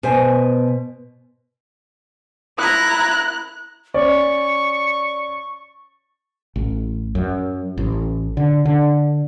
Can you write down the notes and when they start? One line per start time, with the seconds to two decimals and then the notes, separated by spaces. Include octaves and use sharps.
0.03 B2 C5 G#5
2.59 E4 A#5 F#6
3.94 C#4 D5 C#6
6.56 A1
7.15 F#2
7.78 A1
8.37 D3
8.65 D3